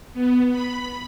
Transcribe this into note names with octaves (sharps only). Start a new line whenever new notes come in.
B3
B5